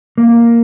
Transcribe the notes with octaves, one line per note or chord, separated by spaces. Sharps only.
A#3